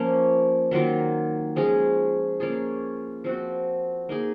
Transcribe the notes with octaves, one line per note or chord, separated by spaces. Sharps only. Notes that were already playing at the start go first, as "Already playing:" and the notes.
Already playing: F3 A#3 C#4
D#3 F#3 A#3 F4
F3 G#3 C#4 G#4
A#3 C#4 F4 G#4
F3 C4 F#4
A#3 D#4 G#4